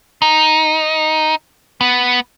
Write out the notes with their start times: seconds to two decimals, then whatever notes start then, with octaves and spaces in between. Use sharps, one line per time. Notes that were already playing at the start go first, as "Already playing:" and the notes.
0.22 D#4
1.81 B3